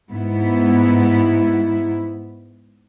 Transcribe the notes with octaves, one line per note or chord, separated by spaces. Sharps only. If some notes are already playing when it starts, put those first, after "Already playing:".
G#2 B3 E4